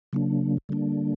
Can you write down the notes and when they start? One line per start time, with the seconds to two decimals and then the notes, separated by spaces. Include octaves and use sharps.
0.13 C#3 F#3 A#3 D4
0.69 D3 G3 A#3 D4